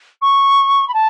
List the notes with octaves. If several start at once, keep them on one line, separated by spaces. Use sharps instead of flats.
C#6
B5
A5